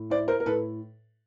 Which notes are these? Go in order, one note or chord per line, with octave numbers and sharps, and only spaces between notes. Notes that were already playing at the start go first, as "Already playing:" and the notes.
Already playing: A2
E4 C5 D5
A#4 C5
A#4
A2 A4 B4